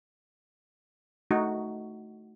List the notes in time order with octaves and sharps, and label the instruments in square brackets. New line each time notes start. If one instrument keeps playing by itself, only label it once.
[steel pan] A3 D#4 F#4